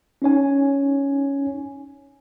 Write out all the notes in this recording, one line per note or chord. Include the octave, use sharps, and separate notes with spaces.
C#4 D#4 C#5 G#5